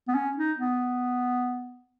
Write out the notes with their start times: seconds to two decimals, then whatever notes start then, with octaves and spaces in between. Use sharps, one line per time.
0.08 B3
0.15 C#4
0.37 D#4
0.58 B3